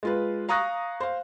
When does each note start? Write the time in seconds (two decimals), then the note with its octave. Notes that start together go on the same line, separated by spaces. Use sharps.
0.03 G#3 F4 B4
0.49 F5 A#5 C#6 D#6 F#6 A#6
1.00 C5 F5